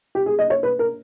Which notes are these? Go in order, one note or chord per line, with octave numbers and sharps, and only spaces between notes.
G4
G#4
D#5
C#5
B4
A#4